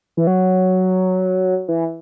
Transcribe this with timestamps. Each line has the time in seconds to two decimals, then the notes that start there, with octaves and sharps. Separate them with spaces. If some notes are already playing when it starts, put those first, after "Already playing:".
0.17 E3
0.27 F#3
1.68 E3